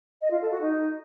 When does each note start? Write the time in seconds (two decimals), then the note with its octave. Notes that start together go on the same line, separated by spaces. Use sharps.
0.21 D#5
0.31 F4
0.41 A4
0.51 F#4
0.61 D#4